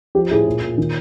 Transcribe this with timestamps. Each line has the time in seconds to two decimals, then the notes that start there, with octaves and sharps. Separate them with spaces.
0.15 F3 G4
0.31 A2 G#4
0.47 A#2
0.62 A#2
0.78 D#3